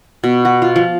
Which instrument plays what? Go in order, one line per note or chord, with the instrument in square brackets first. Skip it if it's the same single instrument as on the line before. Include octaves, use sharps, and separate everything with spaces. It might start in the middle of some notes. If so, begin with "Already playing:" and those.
[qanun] B2
F#4
F4
F3